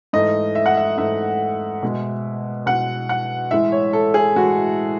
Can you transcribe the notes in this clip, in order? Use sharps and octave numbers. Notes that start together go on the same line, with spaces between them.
G#2 E3 A3 D#5
E5
F#5
E5
G#2 E3 A3 E5
B2 G#3
B2 G#3 F#5
F#5
A2 E3 G#3 E5
C#5
A4
G#4
A2 E3 G#3 F#4